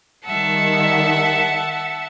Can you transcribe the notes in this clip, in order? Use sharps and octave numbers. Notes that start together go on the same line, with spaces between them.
D#3 G3 E5 F#5 A5